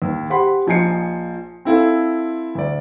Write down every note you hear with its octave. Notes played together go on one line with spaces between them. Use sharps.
D#2
G4 C5 F#5 B5 C6
A#1 F3 D#4 G#5 C7 C#7
C4 E4 A4 F5
D2 D5